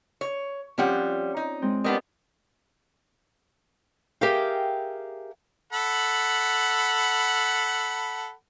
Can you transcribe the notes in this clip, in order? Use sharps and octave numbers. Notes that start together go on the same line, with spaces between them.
C#5
F3 G3 C4 C#4 F4 F#5
D#4
G#3 C4
G3 B3 D4 A#4 D#5
G4 G#4 A#4 E5 F5 G5
A4 F#5 B5